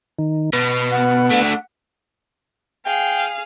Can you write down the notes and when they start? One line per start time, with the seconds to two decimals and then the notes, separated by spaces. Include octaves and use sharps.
0.19 D#3
0.53 B2 B3
0.92 F#5
1.30 A3 D4
2.86 G#4 F5 G5